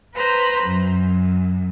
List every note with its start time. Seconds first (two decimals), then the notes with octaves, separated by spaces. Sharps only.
0.13 B4 C5 A#5 B5
0.63 F#2